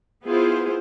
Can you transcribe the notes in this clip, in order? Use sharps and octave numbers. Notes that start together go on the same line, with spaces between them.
B3 E4 F4 G#4 C5